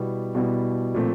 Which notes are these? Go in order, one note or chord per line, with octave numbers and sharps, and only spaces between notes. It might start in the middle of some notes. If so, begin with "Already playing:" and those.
Already playing: B2 G3 B3 E4
B2 G3 B3 E4
A#2 F3 A3 C4